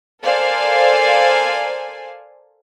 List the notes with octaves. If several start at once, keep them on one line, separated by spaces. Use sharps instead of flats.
A4 A#4 C5 D5 F5 G#5